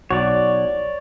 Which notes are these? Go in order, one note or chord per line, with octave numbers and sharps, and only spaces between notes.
B1 F#4 C#5 D5